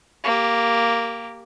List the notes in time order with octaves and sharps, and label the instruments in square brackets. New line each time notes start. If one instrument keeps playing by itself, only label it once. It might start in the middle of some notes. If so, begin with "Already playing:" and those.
[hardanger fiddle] A#3 G4